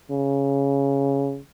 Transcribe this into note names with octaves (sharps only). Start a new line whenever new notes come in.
C#3